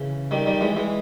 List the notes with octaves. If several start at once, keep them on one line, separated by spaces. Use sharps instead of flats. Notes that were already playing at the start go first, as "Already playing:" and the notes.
Already playing: C#3 E3
D#3 G3
D#3 G3
E3 G#3
E3 G#3